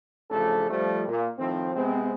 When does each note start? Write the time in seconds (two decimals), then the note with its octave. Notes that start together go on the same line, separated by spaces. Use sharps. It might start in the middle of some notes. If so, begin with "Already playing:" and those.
0.31 A1 C#3 F3 A3 D4 A4
0.70 F3 G3 A3
1.08 A#2
1.39 A2 D#3 F3 C4
1.75 C3 G#3 B3 C4